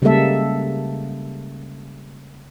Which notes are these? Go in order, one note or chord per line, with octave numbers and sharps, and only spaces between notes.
C#3 G3 G#3 A#3 A4 E5